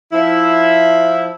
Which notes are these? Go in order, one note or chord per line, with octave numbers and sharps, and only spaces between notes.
F3 E4